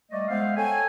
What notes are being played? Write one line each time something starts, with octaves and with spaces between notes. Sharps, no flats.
G3 A3 D5 D#5
G#3 B3 C5 E5 F5
A4 C#5 G5 G#5